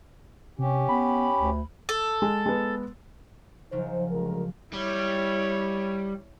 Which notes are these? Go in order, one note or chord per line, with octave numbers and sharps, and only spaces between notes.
C3 C#4 G4
B3 B5
D2
A4
G#3
G#3 B3
C#3 F3 F#3 D#4 C5
D2 G#3 A#4
G3 E4 C#5